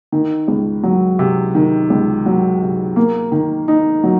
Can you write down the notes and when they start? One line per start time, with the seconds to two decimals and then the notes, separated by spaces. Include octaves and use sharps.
0.12 D#3
0.48 C#2
0.83 F#3
1.19 C3
1.55 D#3
1.90 C#2
2.26 F#3
2.62 C3
2.96 A#3
3.32 D#3
3.68 D#4
4.04 F#3